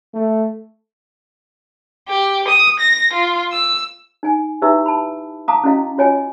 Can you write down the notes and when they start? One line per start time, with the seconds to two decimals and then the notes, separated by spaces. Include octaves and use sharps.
0.14 A3
2.09 G4
2.48 D#6
2.80 A#6
3.13 F4
3.52 E6
4.23 D#4 G#5
4.62 D#4 E4 G4 B4 E5 E6
4.86 A5 B5
5.48 F5 A5 A#5 D6 D#6
5.64 C#4 E4 F#4 D#5 F5
5.98 F4 F#4 C#5 D#5 G5 G#5